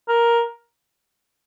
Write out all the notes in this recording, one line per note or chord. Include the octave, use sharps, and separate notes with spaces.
A#4